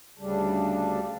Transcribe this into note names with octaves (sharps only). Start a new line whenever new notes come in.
D2 C#3 G3 D4